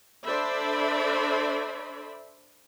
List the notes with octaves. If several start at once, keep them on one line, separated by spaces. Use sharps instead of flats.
D4 A4 C5 D5 E5 B5